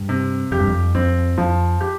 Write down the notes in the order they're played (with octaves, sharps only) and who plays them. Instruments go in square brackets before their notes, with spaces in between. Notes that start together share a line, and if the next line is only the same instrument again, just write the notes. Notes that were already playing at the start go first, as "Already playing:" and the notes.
Already playing: [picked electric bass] G2
[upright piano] C3
[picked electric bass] F2 [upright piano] G4
[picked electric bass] G2
F2
[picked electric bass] F2 [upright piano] C4
[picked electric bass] F2 [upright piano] F3
[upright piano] G4